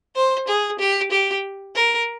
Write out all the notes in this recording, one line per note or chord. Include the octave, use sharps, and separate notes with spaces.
C5
G#4
G4
G4
A#4